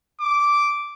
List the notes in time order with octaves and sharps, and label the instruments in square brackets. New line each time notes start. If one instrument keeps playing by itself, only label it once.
[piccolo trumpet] D6